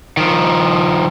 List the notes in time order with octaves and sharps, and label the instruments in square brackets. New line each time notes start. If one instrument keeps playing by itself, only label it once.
[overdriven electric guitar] D#3 F3